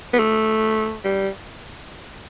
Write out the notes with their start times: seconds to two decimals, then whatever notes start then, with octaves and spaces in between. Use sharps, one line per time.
0.13 B3
0.19 A3
1.04 G3